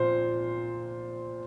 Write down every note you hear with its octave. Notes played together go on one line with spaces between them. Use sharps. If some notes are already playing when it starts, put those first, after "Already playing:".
Already playing: A#2 F3 C5